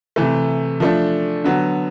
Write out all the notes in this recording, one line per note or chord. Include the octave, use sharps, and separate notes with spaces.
C3 E3 A3
F3 A3 D4
D3 F#3 B3